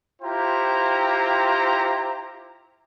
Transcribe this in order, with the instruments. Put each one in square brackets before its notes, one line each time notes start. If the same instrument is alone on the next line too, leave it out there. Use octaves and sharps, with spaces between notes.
[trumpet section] E4 F4 G4 C5 G5 A#5